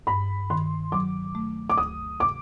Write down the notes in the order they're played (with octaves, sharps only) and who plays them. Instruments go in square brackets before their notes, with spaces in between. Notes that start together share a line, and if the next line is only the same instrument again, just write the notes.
[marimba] G2 [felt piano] B5
[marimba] D#3 [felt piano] C6
[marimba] F#3 [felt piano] D6
[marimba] A3
[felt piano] D6
[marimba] D2 [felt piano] D#6
[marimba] C3 [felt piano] D6